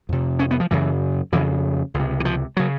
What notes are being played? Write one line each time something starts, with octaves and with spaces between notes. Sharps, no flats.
F2 C3
C#4
B3
F3
F#2 C#3 E3
F2 C#3 E3
C#2
C3
E3
F3
C#3 F#3